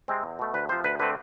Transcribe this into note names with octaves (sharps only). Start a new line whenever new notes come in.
C3 G#3 C4
E2
B2 A3
D2 B4
C3 F3 C5
D2 B4
D3 A3 C4 B4